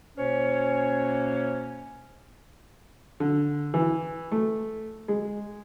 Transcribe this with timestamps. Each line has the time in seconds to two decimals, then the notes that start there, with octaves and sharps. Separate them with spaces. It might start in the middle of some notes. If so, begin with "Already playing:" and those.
0.17 B2 A#3 C#4 C5 C#5
3.20 D3
3.74 E3
4.32 A3
5.08 G#3